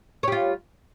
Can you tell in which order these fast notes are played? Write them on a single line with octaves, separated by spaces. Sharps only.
C#5 G3 F4